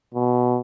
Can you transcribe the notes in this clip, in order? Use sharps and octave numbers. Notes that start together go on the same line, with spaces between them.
B2